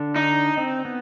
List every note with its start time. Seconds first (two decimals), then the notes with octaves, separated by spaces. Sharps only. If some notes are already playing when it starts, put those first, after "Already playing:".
Already playing: D3 D4
0.16 D#4
0.57 C4
0.85 B3